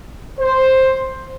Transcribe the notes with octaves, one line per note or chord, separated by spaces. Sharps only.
C5